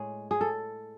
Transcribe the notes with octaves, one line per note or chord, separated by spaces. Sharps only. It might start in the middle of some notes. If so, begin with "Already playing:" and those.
Already playing: A2 G#3 G#4 C#5
G#4
A4